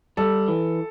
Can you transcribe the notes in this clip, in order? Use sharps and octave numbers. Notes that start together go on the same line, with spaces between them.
G3 A4
E3